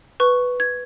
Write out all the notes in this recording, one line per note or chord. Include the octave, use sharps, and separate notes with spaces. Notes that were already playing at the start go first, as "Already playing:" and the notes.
B4 C#6
G#6